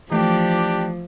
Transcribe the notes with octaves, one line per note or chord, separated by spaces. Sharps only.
E3 F3 A3 D4 G4 D6